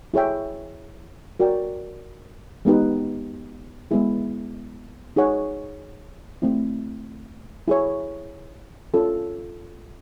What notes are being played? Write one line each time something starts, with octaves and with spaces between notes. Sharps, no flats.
E4 G#4 C#5 E5 G5
F#4 A#4 D5 G5
G#3 B3 D#4 G4 B4
G#3 B3 E4 G#4
D#4 G#4 C#5 F#5
A3 C4 E4
E4 G#4 C#5
C#4 F4 A4